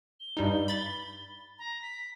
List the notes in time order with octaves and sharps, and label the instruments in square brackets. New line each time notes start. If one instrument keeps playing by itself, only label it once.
[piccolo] G7
[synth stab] G2 G3 D#4
B5 A6
[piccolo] A#5
B6